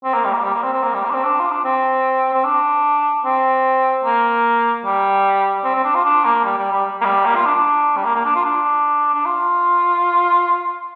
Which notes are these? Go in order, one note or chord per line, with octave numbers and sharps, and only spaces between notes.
C4
A#3
G3
A#3
G3
A#3
C4
C4
A#3
G3
A#3
D4
C4
D4
F4
D4
C4
C4
D4
C4
A#3
G3
C4
C4
D4
F4
D4
A#3
G3
G3
G3
A#3
G3
A#3
F4
D4
D4
G3
A#3
A#3
D4
F4
D4
D4
F4